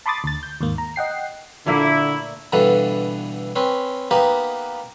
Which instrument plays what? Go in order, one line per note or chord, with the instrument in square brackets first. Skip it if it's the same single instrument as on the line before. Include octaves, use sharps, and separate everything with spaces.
[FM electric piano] A5 B5 C6 D6 D#6 A6
D2 A6
G6
D#2 G#2 A#3
A#5
D#5 F#5 G5 C7
[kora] A#2 A3 A#3 [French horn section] D3 [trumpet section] E4
[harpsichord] G2 B2 D3 E3 A4 B4
C4 C#4 B4
A#3 B3 D#4 G4 B4